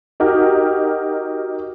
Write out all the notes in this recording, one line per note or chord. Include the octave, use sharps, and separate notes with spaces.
D#4 F#4 G4 A#4